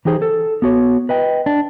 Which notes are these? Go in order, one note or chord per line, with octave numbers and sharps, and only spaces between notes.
E3 D#4 G4 G#4 C5
A4
B3 F#4 C#5
B4 D#5 G5
D4